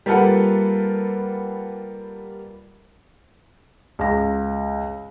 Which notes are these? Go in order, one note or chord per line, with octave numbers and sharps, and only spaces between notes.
G3 A#3 F4 A4 B4 F#5
C#2 A#6